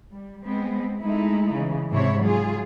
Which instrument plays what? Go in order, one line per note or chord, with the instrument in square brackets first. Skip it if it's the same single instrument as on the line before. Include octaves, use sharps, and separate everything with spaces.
[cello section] G3
G#3 B3 C4
G#3 A3 D#4 E4
C#3 E3
G#2 C3 E4 C#5
F#3 F4 G#4